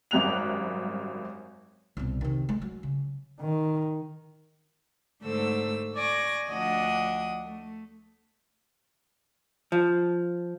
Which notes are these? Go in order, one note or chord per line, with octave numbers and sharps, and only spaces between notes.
G#1 F#2 G3 F#6 F7
C2 B2
C3 D#3
G#3
F#3
C#3
D#3
G#2 D3 A3 A4 C5 E6
D5 G#5 C#6 A#6
D2 F3 D4 D#5 F#5 D#6
A3
F3